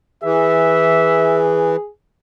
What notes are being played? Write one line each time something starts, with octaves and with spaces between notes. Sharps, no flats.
E3 G#4 E5